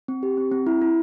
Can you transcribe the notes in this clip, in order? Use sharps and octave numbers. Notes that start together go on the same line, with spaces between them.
C4
G4
C4
C4
E4
E4